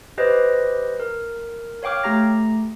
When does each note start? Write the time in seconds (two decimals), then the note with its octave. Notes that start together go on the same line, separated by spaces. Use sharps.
0.18 G4 B4 C5 D#5
1.00 A#4
1.83 C#5 F5 G5 D6 F6
2.04 A3 G4 A#5 A#6